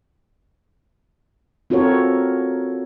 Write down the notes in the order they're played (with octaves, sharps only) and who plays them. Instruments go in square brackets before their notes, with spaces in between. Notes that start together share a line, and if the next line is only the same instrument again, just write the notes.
[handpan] C4 F4 F#4 A4 A#4 C#5